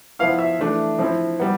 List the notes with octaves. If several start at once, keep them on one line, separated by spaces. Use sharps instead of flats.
F3 B3 E4 F5
E5
E3 A3 D4
F3 C4 E4
G3 B3